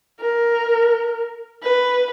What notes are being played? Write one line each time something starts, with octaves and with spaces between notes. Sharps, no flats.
A#4
B4